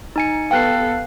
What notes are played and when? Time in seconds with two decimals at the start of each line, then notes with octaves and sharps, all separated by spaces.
0.16 D#4 G#5 C#7
0.51 B3 G4 A4 B4 F5 G5 F#6 C7